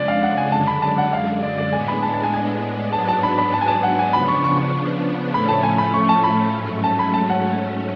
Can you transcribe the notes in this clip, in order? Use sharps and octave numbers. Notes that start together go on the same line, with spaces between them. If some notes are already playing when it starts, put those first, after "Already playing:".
Already playing: F2 C#3 G#3 D4 D5
F5
F#5
G#5
F#2 D3 G#3 D4 A5
B5
A5
F#5
F5
D5
D5
A2 G#3 B3 D4 G#5
B5
A5
A5
G#5
G#5
G#2 F#3 B3 D4 A5
A5
B5
B5
A5
G#5
A5
F#5
G#5
C#3 F3 B3 D4 B5
C#6
C#6
C#6
A2 F3 A3 C#4 B5
A5
G#5
B5
C#6
A5
B5
G#2 F#3 A3 C#4
A5
B5
A5
F#5